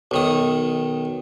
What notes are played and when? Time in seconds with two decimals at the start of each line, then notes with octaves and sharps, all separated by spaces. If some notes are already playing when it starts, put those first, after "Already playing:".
0.11 B1 D#3 D#6